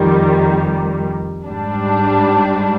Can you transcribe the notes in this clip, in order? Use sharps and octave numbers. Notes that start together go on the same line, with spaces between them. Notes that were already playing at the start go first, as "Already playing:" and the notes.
Already playing: F2 D#3 G3
G#2 G3 D4